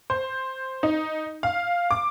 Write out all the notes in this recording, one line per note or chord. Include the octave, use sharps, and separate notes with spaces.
C5
D#4
F5
D6